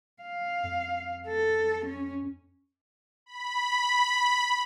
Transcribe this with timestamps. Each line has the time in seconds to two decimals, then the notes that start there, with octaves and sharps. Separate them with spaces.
0.22 F5
0.63 F2
1.27 A4
1.85 C#4
3.26 B5